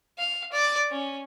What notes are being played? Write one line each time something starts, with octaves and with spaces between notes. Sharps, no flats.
F5
D5
C#4